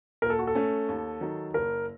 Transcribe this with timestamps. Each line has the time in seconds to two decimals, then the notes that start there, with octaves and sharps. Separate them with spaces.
0.22 A#2 A#4
0.30 A4
0.39 F#4
0.47 A4
0.55 A3 C#4
0.89 D#2
1.21 D#3 F#3
1.54 F#1 A#4